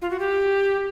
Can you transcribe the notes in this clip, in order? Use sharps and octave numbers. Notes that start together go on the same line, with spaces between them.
F4
F#4
G4